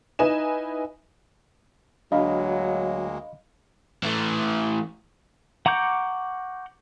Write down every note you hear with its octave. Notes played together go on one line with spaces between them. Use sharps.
D#4 E4 B4 D#5 G#5 E7
D2 F#3 G#3 A#3 D4 D#5 F5 B5
E3 A3
F#5 A#5 C#6 D6 G6